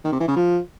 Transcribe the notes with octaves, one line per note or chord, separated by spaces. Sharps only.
D#3
C3
E3
C#3
F3